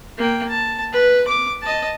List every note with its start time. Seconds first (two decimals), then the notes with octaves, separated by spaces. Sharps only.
0.18 A#3 G5
0.49 A5
0.93 B4
1.27 D6
1.61 D#5 A5